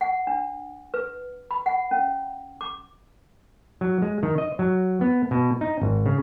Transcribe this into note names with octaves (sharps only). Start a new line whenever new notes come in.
F#5
D4
B4
B5
F#5
C#4
D6
F#3
G#3
D#3
D#5
F#3
B3
B2
D#4
G#1
C#3